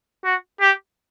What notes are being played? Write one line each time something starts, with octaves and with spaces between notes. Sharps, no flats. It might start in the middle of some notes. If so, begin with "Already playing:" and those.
F#4
G4